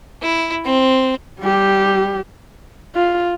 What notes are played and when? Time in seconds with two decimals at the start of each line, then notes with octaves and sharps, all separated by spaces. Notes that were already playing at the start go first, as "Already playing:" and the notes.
0.22 E4
0.64 C4
1.40 G3 G4
2.95 F4